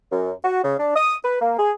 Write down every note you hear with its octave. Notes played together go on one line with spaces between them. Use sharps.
F#2
F#4
C#3
D4
D#6
B4
A#3
G#4